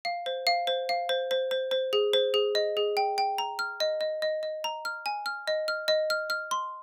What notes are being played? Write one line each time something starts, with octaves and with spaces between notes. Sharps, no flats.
F5
C5
F5
C5
F5
C5
C5
C5
C5
G#4
C5
G#4
D#5
G#4
G5
G5
A#5
F6
D#5
D#5
D#5
D#5
A#5
F6
G#5
F6
D#5
F6
D#5
F6
F6
C6